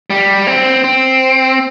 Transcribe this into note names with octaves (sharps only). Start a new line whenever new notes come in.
G3
C4
C4